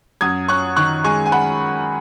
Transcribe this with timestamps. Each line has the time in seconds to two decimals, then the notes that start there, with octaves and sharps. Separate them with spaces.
0.21 F#2 D#6 G#6
0.48 C#4 C#6 F#6
0.76 D#3 C#6 F#6
1.04 G#3 G#5 C#6
1.26 G#5
1.32 F#5 B5